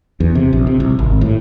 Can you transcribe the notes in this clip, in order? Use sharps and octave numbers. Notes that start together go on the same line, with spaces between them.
E2
C3
A#1
C3
C2
G#1
A2